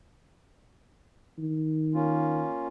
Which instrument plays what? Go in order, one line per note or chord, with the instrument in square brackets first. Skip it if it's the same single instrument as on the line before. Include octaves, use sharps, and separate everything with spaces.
[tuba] D#3
[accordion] A#3 C#4 F4